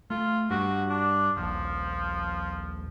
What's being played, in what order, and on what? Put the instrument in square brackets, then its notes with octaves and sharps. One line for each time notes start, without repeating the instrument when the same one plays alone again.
[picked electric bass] A3 [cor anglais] F4
[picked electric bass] G2 [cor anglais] F#4
[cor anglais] D4
[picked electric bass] D#1 A#1 [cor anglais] F3